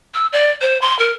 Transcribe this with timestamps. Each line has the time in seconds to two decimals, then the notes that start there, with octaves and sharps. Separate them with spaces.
0.14 E6
0.32 D5
0.61 C5
0.81 C6
0.99 A#4